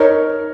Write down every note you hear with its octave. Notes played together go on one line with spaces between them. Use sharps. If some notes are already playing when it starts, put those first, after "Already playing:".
Already playing: D#4 A#4 C#5